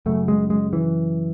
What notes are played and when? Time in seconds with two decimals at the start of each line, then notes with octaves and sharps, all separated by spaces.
0.06 F#2 C#3 A3
0.28 G#3
0.50 G#3
0.73 E3